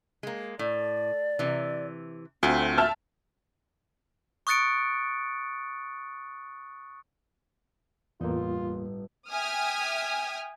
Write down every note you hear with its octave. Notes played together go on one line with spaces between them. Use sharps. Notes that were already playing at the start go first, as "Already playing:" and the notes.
G#3 A#3
A2 D5
C3 E3
D2 A3 C4 F4 F#4
E5 A5 F6
C#6 D#6 F#6 A6 C#7 D7
G1 E2 A2 A#3 D#4 F4
E5 G5 G#5 D#6 F6